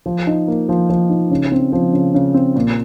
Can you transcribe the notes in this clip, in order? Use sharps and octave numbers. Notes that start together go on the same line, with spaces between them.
F3
D#4
A#3
F3
F3
D#4
C#3
C4
F3
C#3
C#3
C4
A#2